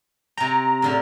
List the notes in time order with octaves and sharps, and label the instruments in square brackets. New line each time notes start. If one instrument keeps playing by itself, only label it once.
[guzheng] C3 G5 [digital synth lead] A#5
[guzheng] A2 D3 F5